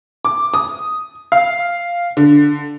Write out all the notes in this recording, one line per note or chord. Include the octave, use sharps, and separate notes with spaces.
D6
D#6
F5
D3